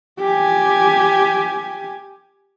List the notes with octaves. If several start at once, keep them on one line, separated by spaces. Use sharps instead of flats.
G4 G#5